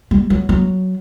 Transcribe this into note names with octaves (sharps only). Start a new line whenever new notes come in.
G3
F#3
F#3